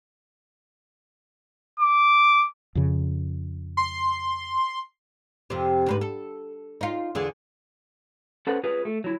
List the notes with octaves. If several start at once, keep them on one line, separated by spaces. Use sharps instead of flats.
D6
F2 C#3
C6
F2 C3
D2 G#2 B4
A4
D#4 F4
E2 D3 G#4
C#4 A4 B4 C5 F#5
F4 G#4 B4
A3
F#3 E4